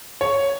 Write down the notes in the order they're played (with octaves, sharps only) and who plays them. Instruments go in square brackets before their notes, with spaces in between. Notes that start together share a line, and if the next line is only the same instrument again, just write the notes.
[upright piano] C#5